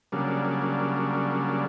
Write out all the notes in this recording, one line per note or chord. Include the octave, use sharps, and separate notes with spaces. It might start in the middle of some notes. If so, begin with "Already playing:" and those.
C#3 F#3 G3 A#3 D4